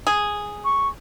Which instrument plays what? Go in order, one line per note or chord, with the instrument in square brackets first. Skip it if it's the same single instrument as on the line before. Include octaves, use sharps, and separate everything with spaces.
[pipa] G#4
[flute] C#6